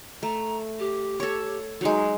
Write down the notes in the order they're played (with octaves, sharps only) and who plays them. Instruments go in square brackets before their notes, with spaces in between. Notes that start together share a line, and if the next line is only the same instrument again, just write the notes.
[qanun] A3 [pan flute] A#5
[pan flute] G4
[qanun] A4 C#5
[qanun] F#3 G#3 [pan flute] D#4